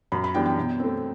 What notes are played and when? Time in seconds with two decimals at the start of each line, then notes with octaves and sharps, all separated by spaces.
0.12 F#2 B5
0.24 B5
0.34 E3 G3 B3 D4 G5
0.46 G5
0.57 B2
0.80 A3 C4